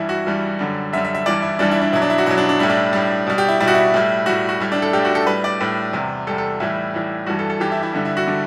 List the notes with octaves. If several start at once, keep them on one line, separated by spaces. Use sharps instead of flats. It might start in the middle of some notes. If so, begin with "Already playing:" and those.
Already playing: G2 E3 G3 E4
F#4
G2 E3 G3
F#2 D3 G3
F#2 D3 G3 E5
E5
E5
G2 E3 G3 D5
E4
G2 E3 G3 D4
E4
D4
B2 F#3 E4
D4
E4
F#4
B2 F#3 E4
D4
D4
A2 G3 E4
D4
A2 G3
B2 G3
G4
E4
B2 G3 E4 F#4
E4
A2 G3
A2 G3 F#4
F#4
A2 G3 E4
D4
A4
A2 G3 G4
F#4
A4
A2 G3 B4
D5
A2 G3 B4
E2 C3 G3
E2 C3 G3 A4
A4
A2 E3 G3 E4
A2 E3 G3
G2 E3 G3 F#4
A4
A4
G2 E3 G3 G4
E4
E4
G2 D3 G3 E4
E4
F#4
D3 G3